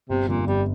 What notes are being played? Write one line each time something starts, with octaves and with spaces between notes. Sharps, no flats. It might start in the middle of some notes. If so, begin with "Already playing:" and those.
G1 C3
F2 A#2 D3 G3
G1 G3